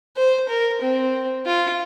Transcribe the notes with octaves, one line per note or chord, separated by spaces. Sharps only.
C5
A#4
C4
F4